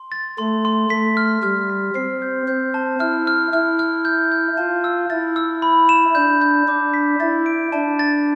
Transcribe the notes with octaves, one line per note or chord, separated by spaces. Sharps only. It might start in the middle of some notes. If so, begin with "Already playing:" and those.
Already playing: C6
A6
A3 C6
C6
A3 B6
F6
G3 F6
B6
C4 C7
G6
C4 G6
A5
E4 F6
F6
E4 F6
F6
G6
G6
F4 A5
E6
E4 A6
E6
B5
E7
D4 G6
G6
D4 D6
B6
E4 A6
D7
D4 A5
A6